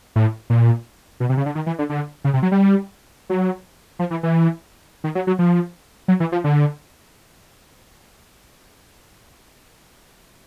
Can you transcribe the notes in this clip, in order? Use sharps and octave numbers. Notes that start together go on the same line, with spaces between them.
A2
A#2
B2
C3
C#3
D3
D#3
E3
D3
D3
C#3
C3
F#3
G3
F#3
F3
E3
E3
D#3
F#3
F#3
F3
F#3
E3
F3
D3